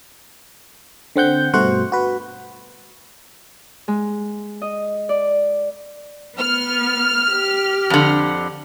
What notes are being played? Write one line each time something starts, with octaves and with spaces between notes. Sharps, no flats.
D3 C4 F#5 G6
G2 B2 A3 F#4 C5 F#5
F#4 B4
G#3
D#5
D5
B3 F6
G4
F2 D3